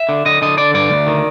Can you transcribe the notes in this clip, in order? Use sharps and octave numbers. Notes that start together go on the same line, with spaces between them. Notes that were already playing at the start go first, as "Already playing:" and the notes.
Already playing: E5
D3
D3 D#5
D3 D#5
D3 D5
G2 D5
D2
D#3